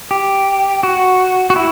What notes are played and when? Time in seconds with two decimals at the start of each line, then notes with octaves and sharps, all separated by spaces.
0.11 G4
0.83 F#4
1.50 F#4
1.56 E4